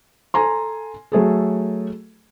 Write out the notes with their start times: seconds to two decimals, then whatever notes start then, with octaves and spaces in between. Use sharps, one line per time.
0.34 A4 G#5 A#5 C6
1.12 F#3 A3 G#4 A4